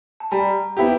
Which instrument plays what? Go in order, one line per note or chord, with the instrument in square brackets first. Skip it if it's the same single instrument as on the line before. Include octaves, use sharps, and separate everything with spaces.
[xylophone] A5
[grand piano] G3 [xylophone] G#5 A#5
[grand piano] B3 E4 G4